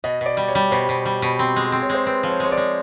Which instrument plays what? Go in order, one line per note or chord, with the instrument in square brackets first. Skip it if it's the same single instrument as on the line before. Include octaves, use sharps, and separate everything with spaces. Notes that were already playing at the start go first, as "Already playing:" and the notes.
[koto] B2 [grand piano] D#5
[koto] B2 [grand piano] D5
[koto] G3
[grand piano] C#5
[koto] G3
[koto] B2 [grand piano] C5
[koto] B2
G3
B2
C4
G#3
C4
[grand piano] C#5
[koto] G#3 [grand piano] C5
[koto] C4 [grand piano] B4
[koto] F3
[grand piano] C#5
[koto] G#3 [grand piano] C#5
[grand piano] D5
[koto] G#3